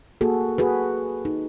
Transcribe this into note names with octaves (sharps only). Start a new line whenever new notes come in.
A#3 F#4 G#4 A4
F#4 G#4 B4
D#4